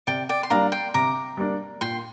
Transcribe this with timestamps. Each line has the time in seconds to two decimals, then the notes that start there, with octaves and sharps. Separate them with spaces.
0.07 C3 D5 G5
0.29 D5 G5
0.43 C6
0.50 G3 A#3 D4 F5 A#5
0.72 G5 C6
0.94 C3 A#5 D6
1.37 G3 A#3 D4
1.81 A#2 G5 C6